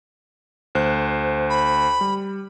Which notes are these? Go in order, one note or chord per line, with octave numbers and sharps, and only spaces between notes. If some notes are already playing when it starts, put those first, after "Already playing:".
D2 C5 F#6
B5
G3